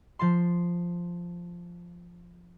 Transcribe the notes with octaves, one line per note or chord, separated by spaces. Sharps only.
F3 A5 C6